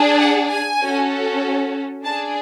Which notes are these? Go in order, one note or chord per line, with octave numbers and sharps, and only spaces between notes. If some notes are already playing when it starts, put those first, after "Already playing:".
Already playing: D4 G#4
F#5
G#5
C#4 F#4 A4
D4 G#4 A5